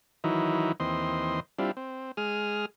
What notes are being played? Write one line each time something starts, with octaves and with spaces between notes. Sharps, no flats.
D#3 E3 F#3 D#4 E4
D#2 E3 C4 D#5 C6
G3 C4 D4 E4 F4
C4
G#3 G#4 D#6 F6